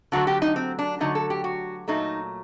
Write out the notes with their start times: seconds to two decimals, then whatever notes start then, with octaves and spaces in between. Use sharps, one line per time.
0.12 D3 F#3 A3 F#4
0.27 G4
0.42 D#4
0.56 C4
0.79 D4
1.00 D3 F#3 A3 D#4
1.15 A4
1.30 G4
1.44 F#4
1.88 A#2 F#3 A3 D#4